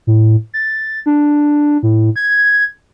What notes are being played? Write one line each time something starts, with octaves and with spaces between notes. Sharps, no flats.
A2
A6
D4
A2
G#6